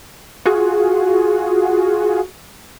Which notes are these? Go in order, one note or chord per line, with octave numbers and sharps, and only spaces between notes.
F4 F#4 G#4